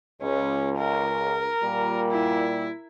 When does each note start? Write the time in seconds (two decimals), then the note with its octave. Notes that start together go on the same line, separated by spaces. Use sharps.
0.22 C#2 C#4
0.79 A#4
1.63 A#2 G3
2.11 E4